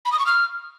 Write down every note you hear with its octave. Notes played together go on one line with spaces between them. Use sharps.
B5
D#6
C#6
F6